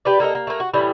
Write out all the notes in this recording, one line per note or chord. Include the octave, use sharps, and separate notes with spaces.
G4 B4 D5
A#3 A4 A#4 D#5
A#3
A3 A#3
F#4
A2 E3 G3